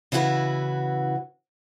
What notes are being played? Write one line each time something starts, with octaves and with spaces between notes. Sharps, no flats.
C#3 E3 E4 F#4 B4